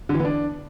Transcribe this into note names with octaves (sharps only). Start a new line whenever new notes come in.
D3
E3
B3
D4